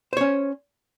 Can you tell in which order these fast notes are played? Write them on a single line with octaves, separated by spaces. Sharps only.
C5 C#5 C#4